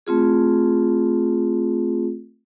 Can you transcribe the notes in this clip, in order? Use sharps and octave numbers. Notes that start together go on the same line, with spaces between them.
A3 C4 F4 G#4